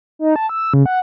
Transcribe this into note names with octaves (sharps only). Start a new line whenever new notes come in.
D#4
A5
E6
C#3
F#5